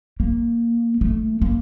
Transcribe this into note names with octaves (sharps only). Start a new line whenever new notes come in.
A#3
A3
A#3